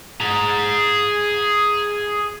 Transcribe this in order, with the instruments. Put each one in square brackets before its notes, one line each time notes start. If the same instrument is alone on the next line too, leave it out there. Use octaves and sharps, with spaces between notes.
[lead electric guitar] G#4 A#5